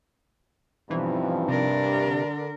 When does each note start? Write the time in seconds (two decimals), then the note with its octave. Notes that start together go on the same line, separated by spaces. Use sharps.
0.90 G2 B2 E3 F3 C4 D#4
1.48 C3 D4 A#4
2.07 D3